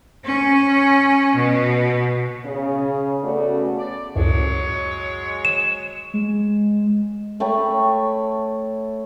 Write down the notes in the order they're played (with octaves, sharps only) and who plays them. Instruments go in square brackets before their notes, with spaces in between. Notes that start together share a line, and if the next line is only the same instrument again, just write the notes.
[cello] C#4
B2
[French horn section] C#3
C#3 A3 B3 F#4 D5
[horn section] D5
[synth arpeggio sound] C#2 F#2 A2 [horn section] F#3 G#3 C#5
[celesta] E7
[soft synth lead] G#3
[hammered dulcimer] A3 C#5 G5 B5